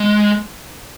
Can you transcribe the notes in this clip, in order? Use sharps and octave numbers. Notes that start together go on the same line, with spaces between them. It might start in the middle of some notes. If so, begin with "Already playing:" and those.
Already playing: G#3